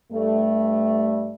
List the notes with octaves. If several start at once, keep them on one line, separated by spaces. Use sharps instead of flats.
G2 G3 A3